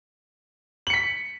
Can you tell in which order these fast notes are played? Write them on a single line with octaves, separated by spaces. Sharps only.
F#7 C#7 B6